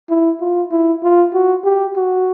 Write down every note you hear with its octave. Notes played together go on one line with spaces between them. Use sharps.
E4
F4
E4
F4
F#4
G4
F#4